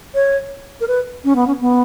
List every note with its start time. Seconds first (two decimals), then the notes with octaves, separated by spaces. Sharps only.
0.15 C#5
0.81 A#4
0.88 B4
1.24 C#4
1.36 B3
1.47 C#4
1.61 B3